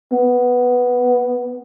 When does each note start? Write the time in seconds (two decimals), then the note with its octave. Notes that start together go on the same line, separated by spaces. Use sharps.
0.12 B3